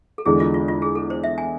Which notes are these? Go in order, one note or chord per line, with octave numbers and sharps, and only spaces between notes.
A4
E2 D3 G#3 G#4
F4
F4
F4
G#4
A4
C5
E5
G#5